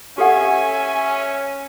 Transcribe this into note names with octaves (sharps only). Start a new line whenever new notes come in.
C#4 G4 A4 E5 F#5 G#5